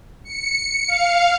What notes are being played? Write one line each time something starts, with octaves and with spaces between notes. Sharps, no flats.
C#7
F5